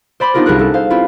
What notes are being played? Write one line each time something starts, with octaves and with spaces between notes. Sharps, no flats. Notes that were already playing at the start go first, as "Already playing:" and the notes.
C5 D5 B5 C6 D6
B3 D4 D#4 F4 G4 A#4
C2 B3 G#4 A#4 F#6
C#4 A4
C5 F5
C4 C#4 E4 F4 G4 B4